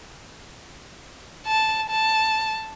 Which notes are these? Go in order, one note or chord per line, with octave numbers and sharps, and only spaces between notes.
A5
A5